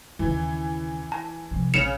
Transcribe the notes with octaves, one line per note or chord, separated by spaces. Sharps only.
D#2 C#3 E3
A5
C3 F3
A#1 C#3 C#7 E7 F7